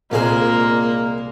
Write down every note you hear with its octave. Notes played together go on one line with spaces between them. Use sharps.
C2 A#2 G#3 A#3 G#4 C5 G#5